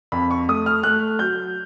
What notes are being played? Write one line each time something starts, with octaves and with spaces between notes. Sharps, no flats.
F2 B5
C#6
A3 D#6
F6
A3 F#6
F#3 G6